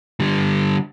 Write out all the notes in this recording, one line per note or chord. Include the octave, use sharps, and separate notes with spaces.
D3 G3